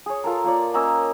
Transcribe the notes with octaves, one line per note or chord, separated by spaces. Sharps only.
G#4 C#5
F4 A4 A#4
A#3 F4 C#5 D5
A#3 C#4 D#5 E6